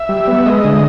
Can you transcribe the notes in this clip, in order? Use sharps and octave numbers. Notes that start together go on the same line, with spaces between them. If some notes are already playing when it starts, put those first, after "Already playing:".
Already playing: E5
G3
B3
G#3 D#5
D3